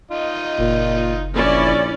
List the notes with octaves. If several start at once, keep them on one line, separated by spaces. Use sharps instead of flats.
D#4 F4 D#5
F#1 A#2
A#1 E3 C#4 E4 D5